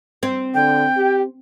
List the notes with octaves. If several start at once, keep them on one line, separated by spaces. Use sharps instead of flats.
C4
D3 G5
G4